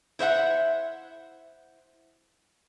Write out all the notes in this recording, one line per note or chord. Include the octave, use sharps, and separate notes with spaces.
E4 C5 E5 F#5